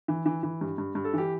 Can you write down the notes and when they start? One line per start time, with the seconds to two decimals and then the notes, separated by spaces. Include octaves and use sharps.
0.08 E3
0.26 E3
0.43 E3
0.61 G2
0.78 G2
0.95 G2
1.04 A4
1.14 E3 G4